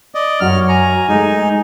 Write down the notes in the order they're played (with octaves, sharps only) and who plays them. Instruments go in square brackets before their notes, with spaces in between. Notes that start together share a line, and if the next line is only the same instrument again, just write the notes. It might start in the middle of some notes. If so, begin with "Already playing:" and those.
[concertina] D5 D#5
[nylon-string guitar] F#2 F#4 [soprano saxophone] C#5 [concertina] F6
[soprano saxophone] G#5 [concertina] A#5
[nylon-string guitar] G#3 A3 [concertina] D#4